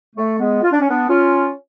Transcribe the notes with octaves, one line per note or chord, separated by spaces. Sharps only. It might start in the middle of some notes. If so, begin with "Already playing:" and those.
A3
G#3 B3
F4
D4
C#4
B3 D4
C#4 F4